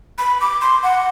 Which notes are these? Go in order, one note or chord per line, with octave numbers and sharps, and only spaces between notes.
B5
D6
C6
F#5